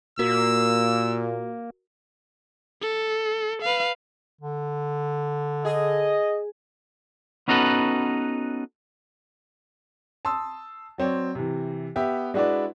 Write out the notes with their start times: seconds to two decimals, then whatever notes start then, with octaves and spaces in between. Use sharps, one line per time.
0.19 A#2 A#3 F#4 A#4 E6
2.81 A4
3.62 B4 F5
4.41 D3
5.65 G#4 D#5
7.48 B3 C#4 D#4 F#4 A4 B4
10.25 A5 C6 D#6 E6
10.98 F#3 C4 C#5 D5
11.35 C3 E3
11.96 B3 G4 E5
12.34 G#3 D4 E4 F#4 B4 D5